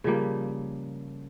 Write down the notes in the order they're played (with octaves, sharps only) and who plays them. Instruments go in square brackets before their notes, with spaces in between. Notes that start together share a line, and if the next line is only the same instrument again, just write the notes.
[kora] C#3 F3 G3 A#3